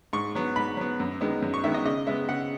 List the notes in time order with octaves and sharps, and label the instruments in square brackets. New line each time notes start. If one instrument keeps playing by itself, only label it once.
[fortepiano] G#2 C#6
F#3 B3
G#2 B5
F#3 B3
F#2
D#3 G#3 B3
F#2
C#6
D#3 G#3 B3 E5
D#5
C#3 D#5
G#3 B3 E5
C#3 F#5